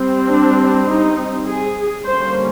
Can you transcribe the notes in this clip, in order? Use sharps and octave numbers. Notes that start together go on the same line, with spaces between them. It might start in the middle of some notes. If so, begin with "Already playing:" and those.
Already playing: G3 C4
D4
D#4
G#4
D3 G3 A#3 C#4 C5